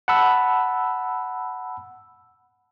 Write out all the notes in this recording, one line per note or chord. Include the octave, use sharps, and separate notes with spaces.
F#5 A5 B5 E6